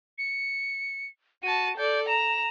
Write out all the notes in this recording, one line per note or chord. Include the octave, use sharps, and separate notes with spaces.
C#7
F#4 A5 D#7
A4 D5 G6
A#5 E7